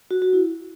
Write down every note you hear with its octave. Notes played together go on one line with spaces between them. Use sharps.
F#4
F#4
E4